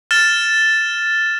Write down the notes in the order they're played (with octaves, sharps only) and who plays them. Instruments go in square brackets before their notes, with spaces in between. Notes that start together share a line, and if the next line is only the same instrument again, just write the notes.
[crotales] F6 A6 E7